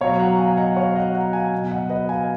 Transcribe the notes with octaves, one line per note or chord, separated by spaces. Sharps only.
B2 F#3 C#5 F5
F#5 A#5
F5 G#5
D#5 F#5
C#5 F5
D#5 F#5
F#5 A#5
F5 G#5
B2 F#3
D#5 F#5
B4 D#5
F5 G#5